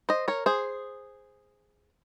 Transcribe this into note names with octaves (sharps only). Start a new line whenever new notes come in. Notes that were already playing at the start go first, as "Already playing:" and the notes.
C5 D#5
A#4 C#5
G#4 C5